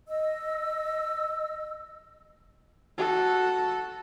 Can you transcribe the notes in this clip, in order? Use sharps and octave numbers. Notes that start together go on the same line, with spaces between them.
D#5 E6
F#4 A4